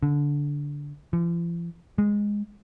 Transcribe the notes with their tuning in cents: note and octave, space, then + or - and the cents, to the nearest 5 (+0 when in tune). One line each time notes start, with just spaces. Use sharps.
D3 -15
F3 -45
G#3 -10